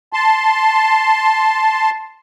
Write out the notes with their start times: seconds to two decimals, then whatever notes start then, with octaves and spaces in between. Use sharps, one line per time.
0.13 A5 C6